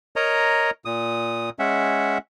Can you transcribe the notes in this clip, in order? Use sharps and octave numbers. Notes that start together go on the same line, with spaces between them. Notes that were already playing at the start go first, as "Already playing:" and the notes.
A#4 C#5 D#5 A#5
A#2 D#6
G#3 C#4 E5 F#5